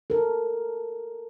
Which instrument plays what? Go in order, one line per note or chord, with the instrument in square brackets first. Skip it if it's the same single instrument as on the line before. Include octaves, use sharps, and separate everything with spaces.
[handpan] A4 A#4